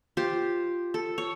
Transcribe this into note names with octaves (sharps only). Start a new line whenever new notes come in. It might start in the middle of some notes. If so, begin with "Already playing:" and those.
F4 G4 C5
A4
C#5